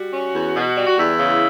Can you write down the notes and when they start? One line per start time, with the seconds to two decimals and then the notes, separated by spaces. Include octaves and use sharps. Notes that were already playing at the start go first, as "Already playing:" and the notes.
Already playing: G3 F#4
0.13 C#4
0.34 E2
0.55 B2
0.77 G3
0.87 F#4
0.98 E2 E4
1.19 C#3